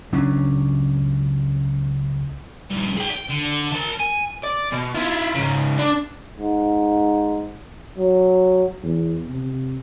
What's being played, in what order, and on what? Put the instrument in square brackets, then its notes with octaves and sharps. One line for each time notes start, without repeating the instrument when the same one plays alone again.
[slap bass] C#2 F#3 C#4 D4
[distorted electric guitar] G2 A#2
G#4 G5
G5
D3
A#4 A5
G#5
[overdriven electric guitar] D5
B2
E4 F4
G#2 C#3
D4
[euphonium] G#2
F#3
[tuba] E2
C3